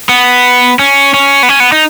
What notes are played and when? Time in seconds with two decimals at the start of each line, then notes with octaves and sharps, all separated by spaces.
0.09 B3
0.79 C#4
1.14 C#4
1.43 B3
1.49 C#4
1.60 B3
1.72 D#4